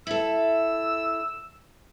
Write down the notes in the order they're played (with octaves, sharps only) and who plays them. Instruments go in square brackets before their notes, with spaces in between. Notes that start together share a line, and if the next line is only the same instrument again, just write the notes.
[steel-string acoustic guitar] E4 A4 [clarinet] E6